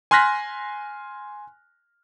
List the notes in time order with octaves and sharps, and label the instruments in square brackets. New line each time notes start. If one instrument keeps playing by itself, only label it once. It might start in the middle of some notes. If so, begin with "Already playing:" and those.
[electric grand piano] G#5 C6 F6 F#6 A#6 B6